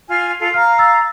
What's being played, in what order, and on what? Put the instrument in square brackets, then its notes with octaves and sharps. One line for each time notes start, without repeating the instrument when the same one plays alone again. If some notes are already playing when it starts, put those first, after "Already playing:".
[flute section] F4 G#5 F6
F4 A4
[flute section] F5 A#5 [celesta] F6
[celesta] E6 A6